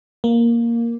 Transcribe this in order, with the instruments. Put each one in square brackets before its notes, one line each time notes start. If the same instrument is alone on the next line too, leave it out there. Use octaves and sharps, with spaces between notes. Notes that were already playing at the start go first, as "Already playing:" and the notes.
[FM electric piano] A#3